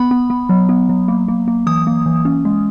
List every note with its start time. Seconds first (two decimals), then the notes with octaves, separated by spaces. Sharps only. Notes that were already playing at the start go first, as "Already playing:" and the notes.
Already playing: B3 B5
0.11 B3
0.30 B3
0.49 F#3
0.69 B3
0.89 F#3
1.08 A#3
1.28 A#3
1.48 A#3
1.67 E3 D#6
1.87 A#3
2.06 E3
2.25 C#4
2.45 G#3